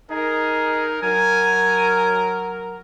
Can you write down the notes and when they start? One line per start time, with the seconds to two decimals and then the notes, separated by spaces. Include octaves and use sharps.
0.11 D#4 G#4 A#4
1.03 F#3 A#4 G#5